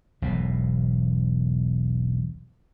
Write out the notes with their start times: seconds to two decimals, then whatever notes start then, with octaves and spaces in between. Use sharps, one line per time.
0.22 E1 B1 E2 B2